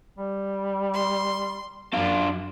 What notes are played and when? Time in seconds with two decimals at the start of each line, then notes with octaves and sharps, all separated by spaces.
0.18 G3
0.93 C6
1.93 F#2 D4 F4